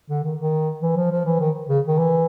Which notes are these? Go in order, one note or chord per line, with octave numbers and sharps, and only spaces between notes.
D3
D#3
D#3
E3
F3
F3
E3
D#3
C#3
D#3
E3